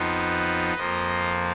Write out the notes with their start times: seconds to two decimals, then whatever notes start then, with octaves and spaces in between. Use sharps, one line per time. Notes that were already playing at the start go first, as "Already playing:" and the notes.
Already playing: F2 F3 B3 D#4 B4
0.75 F2 F3 A#3 D#5